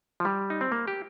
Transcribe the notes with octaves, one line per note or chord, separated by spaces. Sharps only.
F3
G3
D#4
C4
A#3
G4